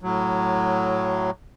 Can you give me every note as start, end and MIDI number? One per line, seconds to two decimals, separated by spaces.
0.01 1.31 45
0.01 1.31 54